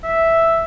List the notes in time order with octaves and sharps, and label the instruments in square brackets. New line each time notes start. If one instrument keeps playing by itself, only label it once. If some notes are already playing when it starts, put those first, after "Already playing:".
[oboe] E5